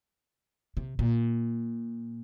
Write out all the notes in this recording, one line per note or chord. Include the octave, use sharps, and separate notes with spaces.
C3
A#2